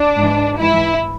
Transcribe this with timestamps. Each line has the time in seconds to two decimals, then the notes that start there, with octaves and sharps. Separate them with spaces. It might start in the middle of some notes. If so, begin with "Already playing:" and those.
Already playing: D4
0.18 G#2 E3
0.58 G#2 E3 E4